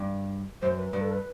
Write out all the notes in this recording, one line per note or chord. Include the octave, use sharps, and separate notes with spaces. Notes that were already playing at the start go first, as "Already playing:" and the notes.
Already playing: G2
F#2 C5
B4
G2 B4
A4
B4